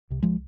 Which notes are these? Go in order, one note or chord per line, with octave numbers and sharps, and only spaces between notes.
C2 C3
F3 G#3